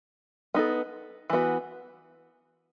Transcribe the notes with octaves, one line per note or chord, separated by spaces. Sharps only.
B3 D#4 A4
E3 B3 F#4